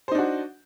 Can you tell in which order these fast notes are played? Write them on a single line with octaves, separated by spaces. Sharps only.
C5 D#4 D4 F#4